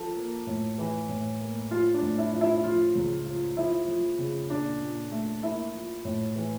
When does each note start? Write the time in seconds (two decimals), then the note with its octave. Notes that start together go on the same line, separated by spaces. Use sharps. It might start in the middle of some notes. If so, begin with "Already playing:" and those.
Already playing: F3 A4
0.16 A#3
0.47 A2
0.78 E3
1.09 A2
1.40 A#3
1.71 F3 F4
1.94 D4
2.02 A2
2.18 E4
2.34 F3
2.41 E4
2.64 F3 F4
2.95 C#2
3.26 F3
3.57 F3 E4
3.88 F3
4.18 C#3
4.50 A#2 D4
4.81 A#2
5.12 A3
5.43 A#3 E4
5.74 F3
6.05 A2
6.36 E3